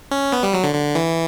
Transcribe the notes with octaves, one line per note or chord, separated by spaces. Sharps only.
C#4
B3
G3
F#3
D3
D3
E3